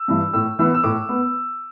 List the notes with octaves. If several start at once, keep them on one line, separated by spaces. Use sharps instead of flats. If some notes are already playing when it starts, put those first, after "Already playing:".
Already playing: E6
G2 E3
A2 E6
E3 B3 E6
E6
A2 D6
B3